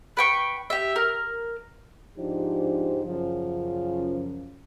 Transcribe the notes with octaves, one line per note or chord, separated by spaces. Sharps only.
B4 G5 C#6
G4 E5
A#4
G#2 F3 D4 D#4 G4 C5
F#2 C#3 F3